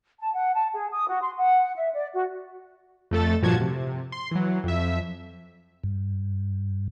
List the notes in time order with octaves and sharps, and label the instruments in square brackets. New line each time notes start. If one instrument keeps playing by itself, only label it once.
[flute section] A5
F#5
A5
G#4
D#6
F#4
C6
F#5
E5
D5
F#4
[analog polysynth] F2 A3 A4 A6
G2 A#2 F3 F#4 A5 G#6
C3
C6
E3 F#3
F2 E5
[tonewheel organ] G2